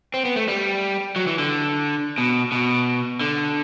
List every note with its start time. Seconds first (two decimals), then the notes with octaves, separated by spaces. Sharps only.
0.14 C4
0.25 B3
0.36 A3
0.48 G3
1.16 F#3
1.27 E3
1.39 D3
2.18 B2
2.52 B2
3.21 D3